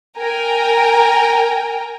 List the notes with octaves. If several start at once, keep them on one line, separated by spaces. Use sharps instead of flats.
A#4 G5 G#5 A#5